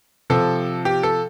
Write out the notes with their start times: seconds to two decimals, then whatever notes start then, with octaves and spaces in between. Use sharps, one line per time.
0.30 C3 F3 A4
0.85 G4
1.03 A4